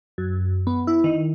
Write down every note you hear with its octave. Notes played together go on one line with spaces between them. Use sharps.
F#2
B3
E4
D#3